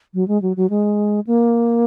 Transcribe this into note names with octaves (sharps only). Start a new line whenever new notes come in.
F#3
G#3
F#3
F#3
G#3
A#3